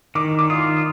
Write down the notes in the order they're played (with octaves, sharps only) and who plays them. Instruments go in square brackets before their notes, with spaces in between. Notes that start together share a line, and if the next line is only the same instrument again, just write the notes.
[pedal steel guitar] D#3 [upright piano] D6
[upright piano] D6
[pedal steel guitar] F4 [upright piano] D#6